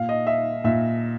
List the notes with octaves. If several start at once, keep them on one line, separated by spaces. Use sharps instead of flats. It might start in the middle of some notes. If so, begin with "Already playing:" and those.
Already playing: A#2 F5
D#5
E5
A#2 E5